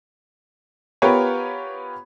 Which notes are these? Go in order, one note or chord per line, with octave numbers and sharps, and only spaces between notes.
B3 F4 G4 A#4 B4 C#5